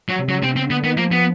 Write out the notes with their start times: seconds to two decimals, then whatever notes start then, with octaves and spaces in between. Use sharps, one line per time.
0.09 F#3
0.19 C3
0.29 C#3 F#3
0.43 C3 C4
0.56 C#3 C4
0.70 D3 B3
0.84 D#3 B3
0.97 F3 A#3
1.12 B3